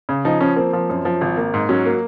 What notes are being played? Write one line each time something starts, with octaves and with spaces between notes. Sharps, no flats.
C#3
F3 D#4
F3 C#4
A#3 C4
F3
F#2
F3
G#1
A#3
G#2
F#3 C#4
A#3